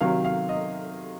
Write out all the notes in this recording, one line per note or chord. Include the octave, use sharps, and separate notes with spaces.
C3 D#3 F#3 F5
F5
D#5